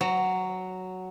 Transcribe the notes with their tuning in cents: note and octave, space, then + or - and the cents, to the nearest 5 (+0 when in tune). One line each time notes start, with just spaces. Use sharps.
F#3 +5 A#5 -25